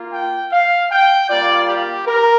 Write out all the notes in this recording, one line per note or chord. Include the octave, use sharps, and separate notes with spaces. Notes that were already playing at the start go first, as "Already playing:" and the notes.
Already playing: A#3 F4
G5
F5
G5
G3 A#3 F4 D5
G4
A#4